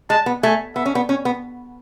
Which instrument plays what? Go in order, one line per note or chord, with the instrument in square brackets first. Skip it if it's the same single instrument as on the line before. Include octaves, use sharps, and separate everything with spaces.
[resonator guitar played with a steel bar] G#3 [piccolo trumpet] A5
[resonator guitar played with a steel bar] B3
[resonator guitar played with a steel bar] A3 [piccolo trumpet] G#5
[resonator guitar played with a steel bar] B3 [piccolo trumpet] E5
[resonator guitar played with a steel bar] C#4
B3
[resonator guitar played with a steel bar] C#4 [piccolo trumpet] C#5
[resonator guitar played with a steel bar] B3